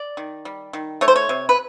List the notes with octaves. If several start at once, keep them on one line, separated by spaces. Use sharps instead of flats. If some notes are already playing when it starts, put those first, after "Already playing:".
Already playing: D5
D#3
G3
D#3
A3 C#5
C5
C#5
C3
B4